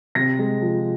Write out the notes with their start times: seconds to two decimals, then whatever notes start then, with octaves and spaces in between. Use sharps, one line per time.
0.15 C3 A#6
0.38 G#3
0.61 F3